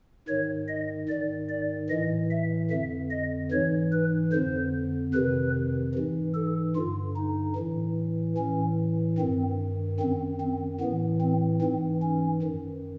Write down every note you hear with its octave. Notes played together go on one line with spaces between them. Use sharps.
G#2 D#3 C#5
D#5
G#2 D#3 D5
D5
A2 E3 D#5
E5
F2 D3 E5
D#5
G#2 E3 C#5
B4
F2 D3 C5
F2 C3 D#3 B4
G#2 E3
A4
G2 D3 F4
D#4
A2 E3
A2 E3 C#4
G2 D#3 C4
F#2 D#3 C4
C4
A2 E3 B3
C4
G#2 E3 C4
C#4
F#2 D#3